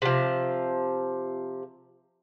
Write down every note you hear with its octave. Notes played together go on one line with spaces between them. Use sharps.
C3 F3